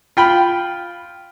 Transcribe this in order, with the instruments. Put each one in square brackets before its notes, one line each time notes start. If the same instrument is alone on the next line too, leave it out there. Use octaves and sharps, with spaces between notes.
[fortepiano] F4 G5 B5